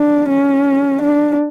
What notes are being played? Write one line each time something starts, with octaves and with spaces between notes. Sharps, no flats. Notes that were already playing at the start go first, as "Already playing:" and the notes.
Already playing: D4
C#4
D4